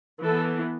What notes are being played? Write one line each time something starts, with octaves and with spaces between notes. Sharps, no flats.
E3 B3 A4